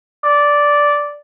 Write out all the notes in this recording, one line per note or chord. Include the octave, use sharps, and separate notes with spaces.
D5